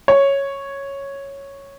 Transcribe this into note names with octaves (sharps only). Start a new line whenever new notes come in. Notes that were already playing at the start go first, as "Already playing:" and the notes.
C#5